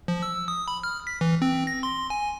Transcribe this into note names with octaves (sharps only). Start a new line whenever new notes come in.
F3
E6
D#6
B5
F6
B6
E3
C4
A#6
C6
G#5